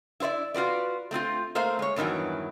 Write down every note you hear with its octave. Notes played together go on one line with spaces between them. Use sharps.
E4 F4 C5 D5 E5
F4 F#4 B4 D5
A3 C4 E4 F4
A3 A#3 C5 E5 F5
G#3 C#5
E2 G2 D#3 E3 F#3